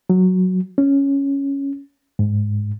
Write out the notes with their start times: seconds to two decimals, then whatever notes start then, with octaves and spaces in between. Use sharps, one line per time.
0.10 F#3
0.78 C#4
2.19 G#2